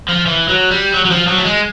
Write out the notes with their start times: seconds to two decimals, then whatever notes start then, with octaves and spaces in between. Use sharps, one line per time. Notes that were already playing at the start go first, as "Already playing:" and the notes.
0.09 F3
0.26 E3
0.48 F#3
0.71 G3
0.94 F#3
1.05 F#3
1.11 F3
1.27 F#3
1.38 A3
1.45 G#3